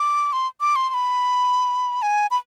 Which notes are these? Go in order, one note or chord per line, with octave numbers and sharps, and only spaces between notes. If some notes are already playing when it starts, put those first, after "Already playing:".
Already playing: D6
C6
D6
C6
C6
B5
G#5
B5